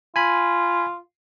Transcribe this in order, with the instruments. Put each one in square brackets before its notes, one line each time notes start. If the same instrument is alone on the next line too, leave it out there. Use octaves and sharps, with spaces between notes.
[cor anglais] F4 [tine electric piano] G#5 B5